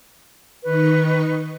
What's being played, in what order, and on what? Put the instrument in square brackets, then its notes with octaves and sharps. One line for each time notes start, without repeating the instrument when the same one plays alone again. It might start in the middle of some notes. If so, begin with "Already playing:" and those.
[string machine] D#3 D#4 C#6 [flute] B4